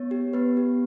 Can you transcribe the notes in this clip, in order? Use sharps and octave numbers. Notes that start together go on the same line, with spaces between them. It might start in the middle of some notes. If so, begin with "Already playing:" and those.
Already playing: B3 C#5
G4
B3 B4
G4